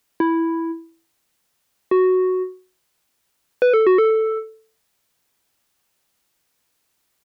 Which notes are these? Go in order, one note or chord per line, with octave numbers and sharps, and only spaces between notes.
E4
F#4
B4
A4
F#4
A4